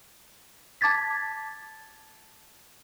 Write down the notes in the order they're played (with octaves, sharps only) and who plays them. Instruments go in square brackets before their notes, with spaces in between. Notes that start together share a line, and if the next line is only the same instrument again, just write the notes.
[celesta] A5 D6 G#6 A6 B6